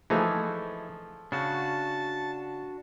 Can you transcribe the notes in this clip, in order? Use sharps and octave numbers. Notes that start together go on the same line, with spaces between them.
E3 F3 A3 D#4 G#4
C#3 D4 F#4 A5